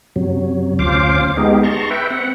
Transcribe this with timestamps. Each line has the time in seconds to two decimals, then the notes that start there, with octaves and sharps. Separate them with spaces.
0.16 F#2 C3 F#3
0.79 D2 C#4 F4 C5 F5 D6
1.37 G#3 B3 D#4 G4 G#4
1.63 A5 A#5 C6 C#6
1.90 B4 E5 G5
2.10 C4 F#5